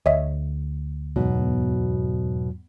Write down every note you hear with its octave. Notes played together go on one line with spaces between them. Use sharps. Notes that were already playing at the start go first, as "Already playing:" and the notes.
D2 C#5 D#5 E5
E2 G#2 B2 F#3